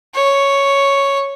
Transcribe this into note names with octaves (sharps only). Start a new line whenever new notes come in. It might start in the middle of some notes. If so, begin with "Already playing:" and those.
C#5